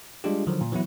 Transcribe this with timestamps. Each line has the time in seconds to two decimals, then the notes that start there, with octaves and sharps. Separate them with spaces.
0.24 G3 G#3 D4 F4 G4
0.47 D3 D#3 F3 F#3
0.61 A#2
0.72 E3 F#3 B3 E4